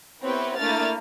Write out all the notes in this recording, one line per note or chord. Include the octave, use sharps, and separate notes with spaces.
B3 C4 E4 G4 B4 C#5
A3 A#3 D4 E4 F6 A6